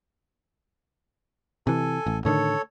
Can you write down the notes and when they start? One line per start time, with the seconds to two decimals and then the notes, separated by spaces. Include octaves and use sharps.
1.67 C3 E3 A4 G#5
2.06 A1
2.25 A2 D3 D#3 A4 C#5